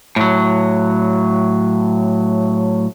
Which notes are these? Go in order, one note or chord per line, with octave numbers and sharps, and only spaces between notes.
A2 F#3